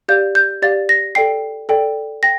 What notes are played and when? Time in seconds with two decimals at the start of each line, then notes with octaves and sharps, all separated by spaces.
0.08 G4 D5 F5 G6
0.35 G6
0.62 G4 D5 F5 A6
0.89 A#6
1.15 A4 D5 G5 C7
1.69 A4 D5 G5
2.23 G5 A#6